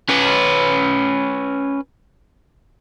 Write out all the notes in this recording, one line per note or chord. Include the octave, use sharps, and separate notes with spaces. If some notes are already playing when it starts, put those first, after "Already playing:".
C#4 B4